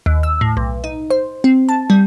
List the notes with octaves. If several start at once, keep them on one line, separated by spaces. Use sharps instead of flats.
D#2
E6
A2
B1
D#4
C5
C4
A5
G3